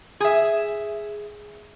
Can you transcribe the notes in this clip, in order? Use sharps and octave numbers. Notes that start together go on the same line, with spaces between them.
G#4 E5